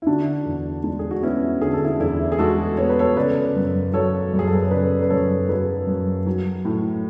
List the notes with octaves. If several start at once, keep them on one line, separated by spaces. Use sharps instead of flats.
E4
D3 D4 F#4
E2
G#3 D4
G#4
F#4
B3 C#4 E4
D3 G#4
A4
E4 G#4
E2 E4 G#4
G#4
G#3 F#4 A4
B3 C#5
B4
A4 C#5
C#3 B4 D5
F#2
F#3 A4 C#5
F#2
G#4
A4
B4
C#5
C#3 B4 D5
B4
F#2 A4 C#5
F#3 G#4 B4
F#2
F#3
A2